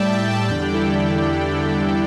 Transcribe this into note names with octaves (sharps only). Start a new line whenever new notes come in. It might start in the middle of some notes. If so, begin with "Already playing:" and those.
Already playing: A2 G3 D5 E5 G5 A5
D5 G5
E5 A5
E2 D3 G3 D5 G5
D4 G4
E4 A4
D4 G4
D4